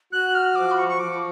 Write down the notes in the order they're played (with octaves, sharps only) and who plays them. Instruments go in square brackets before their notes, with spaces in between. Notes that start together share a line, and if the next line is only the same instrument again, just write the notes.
[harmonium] F#4 [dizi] F#6
[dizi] F6
[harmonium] F3 [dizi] D6
[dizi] B5
C#6
C#6
[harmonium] F3 [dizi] D6